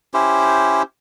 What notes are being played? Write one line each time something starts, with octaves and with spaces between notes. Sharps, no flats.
C#4 E4 G4 C5